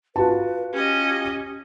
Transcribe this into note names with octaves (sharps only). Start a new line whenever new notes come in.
F4 F#4 B4 A5
C#4 G4 D#5